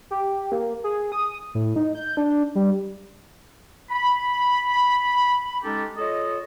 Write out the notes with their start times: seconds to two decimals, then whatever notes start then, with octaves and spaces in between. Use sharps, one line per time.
0.11 G4
0.52 A#3
0.84 G#4
1.12 D#6
1.55 A2
1.76 D#4
1.95 G6
2.17 D4
2.55 G3
3.91 B5
5.64 G#3 C#4 D#4 G4 A4
5.97 F4 A4 C#5 D#5